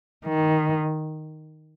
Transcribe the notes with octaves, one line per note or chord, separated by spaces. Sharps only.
D#3